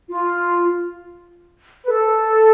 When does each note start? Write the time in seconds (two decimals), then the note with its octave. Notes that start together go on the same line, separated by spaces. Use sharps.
0.09 F4
1.84 B4
1.90 A4